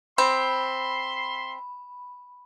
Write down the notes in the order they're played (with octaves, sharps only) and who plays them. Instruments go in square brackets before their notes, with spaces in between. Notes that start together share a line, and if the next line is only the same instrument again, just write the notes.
[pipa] C4 [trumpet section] E5 C6 [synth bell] B5